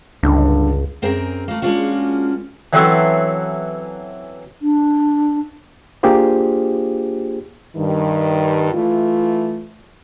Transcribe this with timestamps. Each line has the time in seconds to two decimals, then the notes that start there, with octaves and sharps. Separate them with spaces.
0.23 C#2 G2 D3
1.02 F#2 C4 G#4 A#4 G5
1.48 A3 A#3
1.62 G#3 A#3 C#4 D4 F4 F#4
2.73 E3 F#3 C4 C#4 A4 C6
4.62 D4
6.03 A#3 D4 F4 G4 G#4 C5
7.75 G2 D#3
8.72 E3 A3 F4